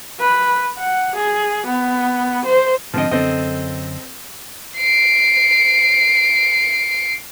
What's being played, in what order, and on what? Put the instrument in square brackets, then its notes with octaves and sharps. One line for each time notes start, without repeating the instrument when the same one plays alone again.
[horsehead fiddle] B4
F#5
G#4
B3
C5
[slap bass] G#2 D3 [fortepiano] F3 C4 D#5
[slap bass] F#2 D3 [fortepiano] C4 A4 D#5
[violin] C7 D7